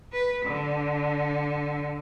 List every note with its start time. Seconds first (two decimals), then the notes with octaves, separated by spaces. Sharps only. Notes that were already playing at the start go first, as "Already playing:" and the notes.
0.12 B4
0.46 D3